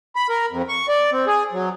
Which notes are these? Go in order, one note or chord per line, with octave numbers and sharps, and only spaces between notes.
B5
A#4
F2
C#6
D5
C4
G#4
F#3